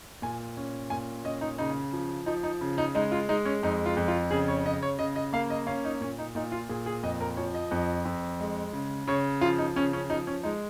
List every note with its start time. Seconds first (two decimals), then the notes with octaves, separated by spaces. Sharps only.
0.22 A#2 G#5
0.57 C#4
0.90 A#2 G#5
1.24 C#4 D#5
1.41 D#4
1.58 C#3 D#4
1.93 F3
2.26 F3 D#4
2.43 D#4
2.61 C#3
2.78 D#4
2.95 G#3 D#4
3.12 F4
3.29 G#3 D#4
3.45 C#4
3.63 F2 D#4
3.86 F4
3.97 F2
4.08 F4
4.31 C#3 G#4
4.48 C#5
4.66 C#3 D#5
4.83 C#5
4.99 C#3 D#5
5.16 D#5
5.33 A#3 F5
5.50 D#5
5.67 C#4 F5
5.85 D#4
6.01 A#2 C#4
6.19 D#4
6.35 A#2 D#4
6.52 F4
6.69 A#2 G#4
6.86 G#4
7.03 F2 D#5
7.21 A#4
7.37 F3 C#5
7.54 D#5
7.71 F2
8.05 F2
8.40 G#3
8.73 C#3
9.07 C#3 C#5
9.41 F3 F4
9.58 D#4
9.76 C#3 C#4
9.93 C#4
10.10 F3 D#4
10.27 C#4
10.43 G#3 D#4